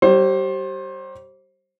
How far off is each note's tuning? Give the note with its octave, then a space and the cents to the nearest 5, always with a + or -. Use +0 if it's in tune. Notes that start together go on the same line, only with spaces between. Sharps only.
G3 -30 C5 +30